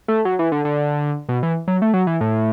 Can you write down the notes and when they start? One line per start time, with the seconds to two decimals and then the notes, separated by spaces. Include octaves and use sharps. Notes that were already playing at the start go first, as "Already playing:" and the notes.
0.08 A3
0.25 F#3
0.39 E3
0.52 D3
0.65 D3
1.29 B2
1.43 E3
1.68 F#3
1.82 A3
1.94 F#3
2.07 E3
2.21 A2